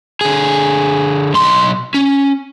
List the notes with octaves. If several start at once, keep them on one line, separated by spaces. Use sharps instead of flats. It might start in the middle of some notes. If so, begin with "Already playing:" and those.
D3 G#4
B1 C6
C#4